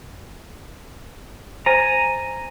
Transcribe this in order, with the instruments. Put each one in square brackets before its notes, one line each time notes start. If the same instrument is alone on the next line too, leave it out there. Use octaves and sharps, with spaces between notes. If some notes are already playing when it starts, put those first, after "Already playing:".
[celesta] C5 A6 [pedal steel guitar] G#5 A#5